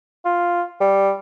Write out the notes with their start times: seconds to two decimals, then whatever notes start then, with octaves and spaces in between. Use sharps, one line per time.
0.25 F4
0.81 G3